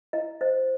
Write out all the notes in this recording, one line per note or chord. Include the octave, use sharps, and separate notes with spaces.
E4 D#5
C5 D#5